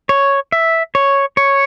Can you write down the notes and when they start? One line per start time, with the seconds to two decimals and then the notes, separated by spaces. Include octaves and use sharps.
0.09 C#5
0.52 E5
0.95 C#5
1.37 C#5